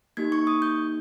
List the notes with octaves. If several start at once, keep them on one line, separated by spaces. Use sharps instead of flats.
A#3 D#4 G4 G#6
C#6
D#6
G6